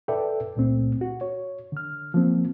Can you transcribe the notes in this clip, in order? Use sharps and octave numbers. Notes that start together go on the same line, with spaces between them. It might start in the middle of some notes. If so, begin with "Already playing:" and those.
A4 B4 D5 E5 G5
C#2 A#2 A3 C4
F#4
C#5
D3 F6
F3 A#3 C4